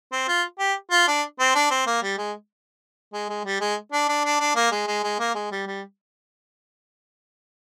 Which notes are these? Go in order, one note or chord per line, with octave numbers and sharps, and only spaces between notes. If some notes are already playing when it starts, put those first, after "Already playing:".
C4
F4
G4
F4
D4
C4
D4
C4
A#3
G3
G#3
G#3
G#3
G3
G#3
D4
D4
D4
D4
A#3
G#3
G#3
G#3
A#3
G#3
G3
G3